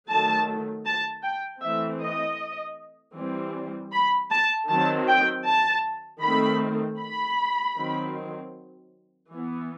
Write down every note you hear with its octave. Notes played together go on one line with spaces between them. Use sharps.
D#3 F#3 A3 A5
A5
G5
E3 A3 C4 E5
D#5
E3 G3 C4
B5
A5
D#3 F#3 C4 A5
G5
A5
D#3 A3 C4 B5
B5
D#3 F#3 C4
E3 B3